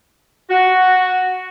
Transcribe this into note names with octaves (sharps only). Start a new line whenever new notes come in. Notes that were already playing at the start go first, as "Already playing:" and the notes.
F#4